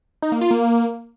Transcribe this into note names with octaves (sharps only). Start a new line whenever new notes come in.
D#4
A#3
F4
A#3